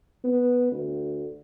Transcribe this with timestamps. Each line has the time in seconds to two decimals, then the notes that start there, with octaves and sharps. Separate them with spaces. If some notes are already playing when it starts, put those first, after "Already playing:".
0.24 B3
0.72 D2